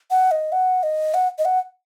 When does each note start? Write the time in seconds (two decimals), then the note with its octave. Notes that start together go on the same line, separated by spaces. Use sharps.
0.11 F#5
0.31 D#5
0.52 F#5
0.83 D#5
1.14 F#5
1.39 D#5
1.45 F#5